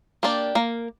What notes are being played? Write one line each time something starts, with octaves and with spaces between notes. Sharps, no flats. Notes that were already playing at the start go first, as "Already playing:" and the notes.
A#3 D4 G4 D5
A#3